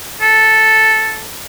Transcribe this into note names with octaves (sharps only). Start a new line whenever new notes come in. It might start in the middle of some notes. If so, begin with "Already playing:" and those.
A4